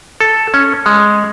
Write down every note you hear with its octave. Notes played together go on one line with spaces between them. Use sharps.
A4
C#4
G#3